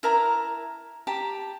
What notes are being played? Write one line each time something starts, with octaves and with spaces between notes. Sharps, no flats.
E4 A#4 A5 A#5
G4 A5 A#5